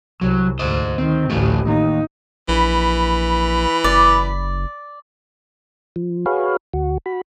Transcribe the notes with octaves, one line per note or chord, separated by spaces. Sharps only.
C2 F#3
D2 G#2 C5 D#5
D#3 C4
A1 D2 A3 G4
D#2 D#4
A#1 E3 B5
F#1 D5
F3
F#4 G#4 B4 C#5 F5
D2 F#4
F#4 B5